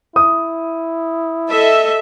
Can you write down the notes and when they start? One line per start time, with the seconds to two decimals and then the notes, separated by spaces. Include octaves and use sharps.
0.16 E4 D#6
1.49 A4 D#5 E5